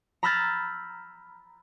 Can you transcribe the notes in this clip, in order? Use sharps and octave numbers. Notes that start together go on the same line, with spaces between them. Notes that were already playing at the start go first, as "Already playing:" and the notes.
A#5 B5 E6 F6 G6 A6